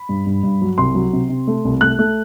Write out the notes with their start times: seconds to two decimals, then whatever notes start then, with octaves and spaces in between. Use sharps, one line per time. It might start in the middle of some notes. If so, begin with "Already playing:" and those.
Already playing: B5
0.09 G2
0.26 G2
0.43 G2
0.62 F#3
0.78 C2 C6
0.95 F#3
1.13 C3
1.29 C3
1.47 A3
1.65 C2
1.81 A3 F#6
1.99 A3